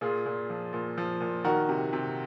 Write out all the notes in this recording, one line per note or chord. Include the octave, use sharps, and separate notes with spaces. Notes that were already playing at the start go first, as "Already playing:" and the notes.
A#2 F4 G#4
A#2
F3
A#2
F3
A#2
D#3 F#4 A#4
C3
C3